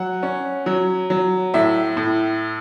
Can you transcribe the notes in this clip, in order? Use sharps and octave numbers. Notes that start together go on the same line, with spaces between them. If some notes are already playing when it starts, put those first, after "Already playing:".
Already playing: F#3 F#5
C#4
F#3
F#3
A2 E5
A2